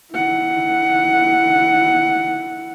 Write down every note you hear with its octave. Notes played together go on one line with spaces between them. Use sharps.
E4 F#5